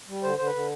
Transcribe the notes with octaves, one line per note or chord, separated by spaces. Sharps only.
G3
D3 C5
D3 C5
B4
D3